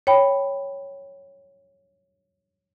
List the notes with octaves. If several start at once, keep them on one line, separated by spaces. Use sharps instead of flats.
C#5 G5 B5